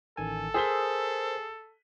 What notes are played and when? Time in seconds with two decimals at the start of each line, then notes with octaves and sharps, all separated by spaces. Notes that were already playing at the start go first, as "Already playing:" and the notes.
0.17 A1 D#3 A4 G#5
0.54 G#4 A#4 C5 E6 B6 G7